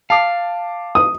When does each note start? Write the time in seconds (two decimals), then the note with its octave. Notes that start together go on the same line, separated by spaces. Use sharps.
0.10 F5 A5 D6
0.95 D#6